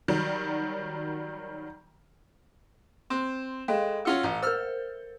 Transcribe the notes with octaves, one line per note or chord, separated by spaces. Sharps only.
D#3 F#3 G3
C4 C6 E7
G#3 A4 F5 G5
C#4 F4 F#4 E6 C#7 G7
A1
A#4 C5 E6 F6